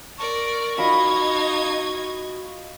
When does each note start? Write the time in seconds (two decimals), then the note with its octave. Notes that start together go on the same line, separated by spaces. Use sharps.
0.18 A#4 D5 C#6
0.78 D#4 F4 F#4 D#5 F5 B5 G#6